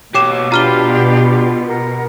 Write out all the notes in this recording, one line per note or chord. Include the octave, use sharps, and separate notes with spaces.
B2 G4 C#5 G5 D6 E7
D4 F4 G4 A#5 B5 F6 G7
A#4 F#5